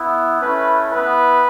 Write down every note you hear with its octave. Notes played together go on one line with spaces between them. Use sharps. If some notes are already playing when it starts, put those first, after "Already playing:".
Already playing: B3 E4
A3 C#4 E4 B4
B3 E4 B4